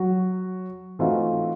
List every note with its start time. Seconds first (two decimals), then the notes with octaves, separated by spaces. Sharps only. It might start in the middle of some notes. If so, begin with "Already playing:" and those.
Already playing: F#3 F#4
0.99 E3 A3 C4 D#4 F4 F#4